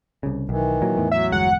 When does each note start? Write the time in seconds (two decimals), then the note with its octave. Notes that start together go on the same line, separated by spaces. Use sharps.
0.23 C2 C#3
0.49 B1 D#3 E3
0.82 A#2 F#3
0.97 E2 A2
1.12 F#3 E5
1.32 G1 E2 G#3 F#5